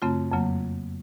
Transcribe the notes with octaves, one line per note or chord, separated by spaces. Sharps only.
F#2 C#3 A3 C4 F4
F2 C#3 F#3 A#3